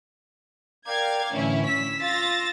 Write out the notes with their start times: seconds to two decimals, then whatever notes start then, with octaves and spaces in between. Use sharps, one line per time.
0.87 A#4 D5 F5 G5 G#6
1.32 A2 D3 E3 C#4 E4
1.67 E6 B6
2.01 F4 A6 A#6